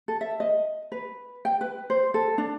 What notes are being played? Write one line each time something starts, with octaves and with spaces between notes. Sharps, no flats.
A4
E5
D#5
B4
G5
B4
C5
A4
D4